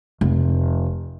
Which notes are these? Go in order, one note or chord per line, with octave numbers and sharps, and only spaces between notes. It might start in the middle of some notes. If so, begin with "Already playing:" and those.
F1